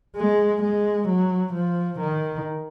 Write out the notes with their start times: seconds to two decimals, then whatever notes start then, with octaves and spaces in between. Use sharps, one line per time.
0.16 G#3
0.62 G#3
1.08 F#3
1.53 F3
1.99 D#3